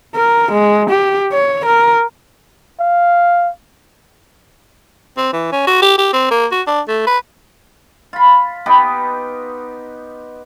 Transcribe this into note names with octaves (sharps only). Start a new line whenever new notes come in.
A#4
G#3
G4
C#5
A#4
F5
C4
E3
C#4
F#4
G4
G4
C4
A#3
F#4
D4
A3
B4
F4 B5
B3 D#4 G4 B4